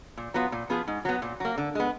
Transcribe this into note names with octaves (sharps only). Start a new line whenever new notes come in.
A#2
F#3 B3 F4
A#2
F3 B3 F4 G#4
G#2
F#3 B3
A#2
F#3 A#3
D3
G#3 B3